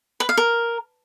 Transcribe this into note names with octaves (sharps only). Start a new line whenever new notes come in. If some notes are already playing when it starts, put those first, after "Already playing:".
B4
F5
A#4